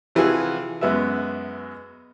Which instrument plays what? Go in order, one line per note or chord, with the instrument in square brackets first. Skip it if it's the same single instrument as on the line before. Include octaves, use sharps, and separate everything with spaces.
[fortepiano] C3 E3 F3 F4 F#4 G#4
F#2 G#3 B3 F#4 E5